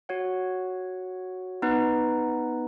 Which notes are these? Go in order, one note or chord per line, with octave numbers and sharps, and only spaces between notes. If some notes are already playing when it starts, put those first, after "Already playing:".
F#4 C#5 F#5
B3 D#4 B4